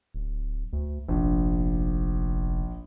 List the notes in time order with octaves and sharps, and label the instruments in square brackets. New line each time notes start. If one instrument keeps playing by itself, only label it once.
[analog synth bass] D1
D2
[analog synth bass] F1 [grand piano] A#1